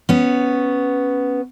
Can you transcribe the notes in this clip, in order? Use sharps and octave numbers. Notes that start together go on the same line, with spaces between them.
B3 C#4